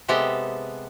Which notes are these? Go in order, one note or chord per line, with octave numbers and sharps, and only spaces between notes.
C3 G#3 B3 G4 A4 G5